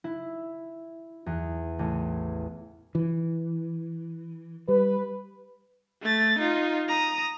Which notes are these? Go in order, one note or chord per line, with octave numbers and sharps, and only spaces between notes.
E4
E2
A1
E3
G3 B4
A3 A6
D#4 F4
A#5 D#6